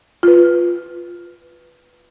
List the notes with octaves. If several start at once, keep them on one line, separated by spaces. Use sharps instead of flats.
F4 B4